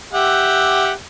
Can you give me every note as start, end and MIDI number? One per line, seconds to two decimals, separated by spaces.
0.13 0.91 67
0.13 0.91 76
0.13 0.91 78